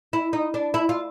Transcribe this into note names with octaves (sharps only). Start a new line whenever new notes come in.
E4
D#4
D4
E4
F4